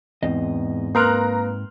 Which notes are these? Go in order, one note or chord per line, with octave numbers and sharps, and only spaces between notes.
E2 G#2 C4 D#5
A#3 A#4 B4 A#5 C6 F6 F#6 D7